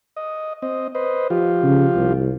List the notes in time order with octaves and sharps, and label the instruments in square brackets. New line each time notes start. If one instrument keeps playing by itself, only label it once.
[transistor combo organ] D#5
C4 D#5
B4 C5 D#5
F3 F4 G4
[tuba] C#3
C2